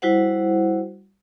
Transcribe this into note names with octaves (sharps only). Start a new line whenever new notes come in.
G3 E4 F#4 C5 F#5